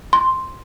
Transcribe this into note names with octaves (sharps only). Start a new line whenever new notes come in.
C6